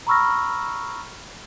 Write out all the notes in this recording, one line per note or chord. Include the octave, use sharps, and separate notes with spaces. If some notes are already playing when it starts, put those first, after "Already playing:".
A#5 B5 C#6 E6 F6 A#6